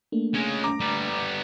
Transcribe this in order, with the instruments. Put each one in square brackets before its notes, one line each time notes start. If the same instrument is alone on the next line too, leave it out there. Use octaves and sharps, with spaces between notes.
[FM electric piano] A3 A#3 D4
[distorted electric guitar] G#3 C#4
[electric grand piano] A#5 D6
[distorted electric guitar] G3 B3